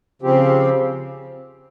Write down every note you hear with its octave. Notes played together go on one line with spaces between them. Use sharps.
C#3 F3 C4 G4